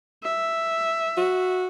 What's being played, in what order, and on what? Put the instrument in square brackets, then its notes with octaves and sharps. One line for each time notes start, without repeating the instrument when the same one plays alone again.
[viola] E5
[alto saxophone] F#4